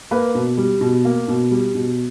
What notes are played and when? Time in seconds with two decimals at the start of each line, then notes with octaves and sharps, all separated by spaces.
0.11 A#3 B4
0.35 B2
0.57 G3
0.81 B2
1.05 A#3
1.28 B2
1.51 G3
1.75 B2